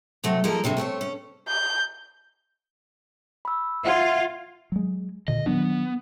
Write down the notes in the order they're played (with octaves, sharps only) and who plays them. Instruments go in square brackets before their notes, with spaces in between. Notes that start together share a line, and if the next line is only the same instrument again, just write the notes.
[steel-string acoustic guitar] C3 F#3 A3
F3 G#3 A#3 D#4 A4 A#4
G2 C3 F3 F#3
A3 C4 B4 C#5
C#4
[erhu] G6
[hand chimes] B5 E6
[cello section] F4 [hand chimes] E5 F#5 G#6
[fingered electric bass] F#3 G#3
[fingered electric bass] A#2 D3 [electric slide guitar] D#5
[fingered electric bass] D#3 F#3 D4 [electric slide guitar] B3